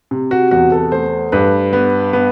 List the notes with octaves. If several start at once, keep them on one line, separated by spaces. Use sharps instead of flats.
C3
F#4
E2 F#4
A4
A3 C5
G2 B4
B3
B3